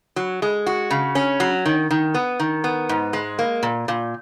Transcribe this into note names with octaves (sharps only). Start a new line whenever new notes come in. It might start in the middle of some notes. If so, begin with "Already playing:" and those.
F#3
G#3
F#4
C#3
C#4
F#3
D#3
D#3
B3
D#3
B3
G#2
G#3
A#3
A#2
A#2